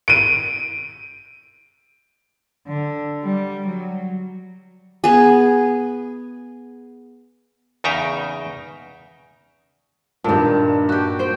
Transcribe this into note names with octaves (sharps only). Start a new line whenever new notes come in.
D7 D#7
D3
G3
F#3
B3 G#4
E2 C#3 D#4 E5 G5 A#5
G2 A#2 D#3 A5
F#4 G4
C5 G5